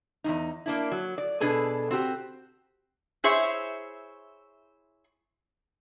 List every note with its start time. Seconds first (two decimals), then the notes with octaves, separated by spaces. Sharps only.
0.24 E2 G2 D#4
0.66 A#3 D4 E4
0.92 F#3
1.18 D5
1.40 B2 D4 G#4 A4 B4
1.91 C4 F#4 G4
3.24 E4 G#4 C5 C#5 E5